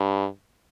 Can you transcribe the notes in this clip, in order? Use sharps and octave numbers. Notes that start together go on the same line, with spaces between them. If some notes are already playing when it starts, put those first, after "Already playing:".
Already playing: G2